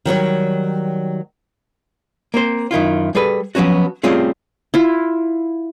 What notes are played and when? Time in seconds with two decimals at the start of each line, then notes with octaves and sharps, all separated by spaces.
0.05 D#3 F#3 G3 C#5
2.34 A#3 C4 C5
2.71 F#2 D#3 E4 F4
3.15 G3 G#4 A4 B4
3.55 F3 F#3 B3 C#4 F#4
4.04 G3 A3 C4 C#4 F4 G#4
4.74 E4 F4